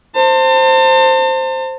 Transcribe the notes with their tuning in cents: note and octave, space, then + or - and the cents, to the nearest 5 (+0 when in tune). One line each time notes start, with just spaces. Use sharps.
C5 +0 A5 +40